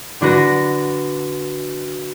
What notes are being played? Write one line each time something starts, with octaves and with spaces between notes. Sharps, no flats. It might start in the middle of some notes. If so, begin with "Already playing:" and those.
D3 D4 F#4 B4 A#6